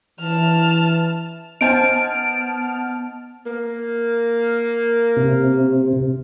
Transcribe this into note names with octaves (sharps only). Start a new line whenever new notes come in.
E3 A5 F6
B3 D#4 C5 G#5 A5 F6 D7
A#3
C3